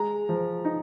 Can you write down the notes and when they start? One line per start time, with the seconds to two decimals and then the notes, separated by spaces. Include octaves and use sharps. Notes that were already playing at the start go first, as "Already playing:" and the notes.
Already playing: G#3 A#5
0.29 F3
0.65 D#4